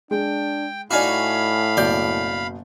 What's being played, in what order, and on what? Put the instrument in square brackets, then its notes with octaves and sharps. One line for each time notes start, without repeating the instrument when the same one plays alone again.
[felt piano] G#3 [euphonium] D4 [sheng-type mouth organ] G5
[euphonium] A2 [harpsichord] D#4 F#4 [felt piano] D5 G#5 F6 [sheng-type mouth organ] F5 B5
[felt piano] F#1 B2 G6 [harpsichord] D5